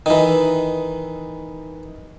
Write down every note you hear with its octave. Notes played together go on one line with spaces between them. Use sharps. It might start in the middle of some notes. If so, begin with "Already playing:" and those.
D#3 E3